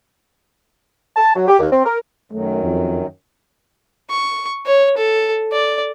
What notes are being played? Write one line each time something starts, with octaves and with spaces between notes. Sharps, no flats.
A5
F#3
G4
D#2
C4
A#4
F#2 D#3 F#3 A3
F2
C#6
C#5
A4
D5